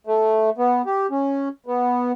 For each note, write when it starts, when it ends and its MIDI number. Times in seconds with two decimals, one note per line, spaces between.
0.07 0.50 57
0.58 0.82 59
0.86 1.07 67
1.11 1.49 61
1.66 2.12 59